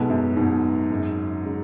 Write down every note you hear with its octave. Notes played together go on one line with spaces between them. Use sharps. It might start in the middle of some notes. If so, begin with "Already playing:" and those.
Already playing: B1 G#2 B2 G#3 B3
F#2
B1 G#2 B2 G#3 B3
G#1 F#2 C#3 G#3
C#3 G#3